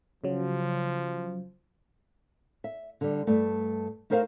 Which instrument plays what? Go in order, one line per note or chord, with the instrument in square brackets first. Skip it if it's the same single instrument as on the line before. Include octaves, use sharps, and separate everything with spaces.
[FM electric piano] C#3 F#3 [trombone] F3
[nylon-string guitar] E5
D3 G3
G2 A3
A3 D#4 A#4 C5 E5 F5